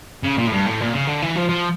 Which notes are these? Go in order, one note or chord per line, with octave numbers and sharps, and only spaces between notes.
C#3
A#2
A2
G2
A2
A#2
C#3
D3
E3
F3
F3